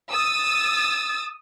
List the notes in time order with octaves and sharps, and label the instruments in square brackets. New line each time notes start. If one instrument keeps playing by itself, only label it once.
[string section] D#6 E6 A6